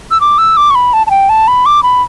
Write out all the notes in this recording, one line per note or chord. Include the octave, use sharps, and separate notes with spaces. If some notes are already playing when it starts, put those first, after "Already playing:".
E6
D6
E6
D6
C#6
B5
A5
A5
G5
A5
B5
D6
B5